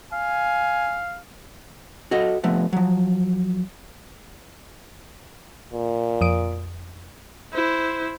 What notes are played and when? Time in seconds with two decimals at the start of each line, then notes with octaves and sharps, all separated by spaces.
0.13 F5 G#5
2.11 F#4 A4 D#5
2.44 F3 A3 B3
2.73 F3 F#3
5.73 A#2
6.21 F2 D#6 D7
7.53 E4 C5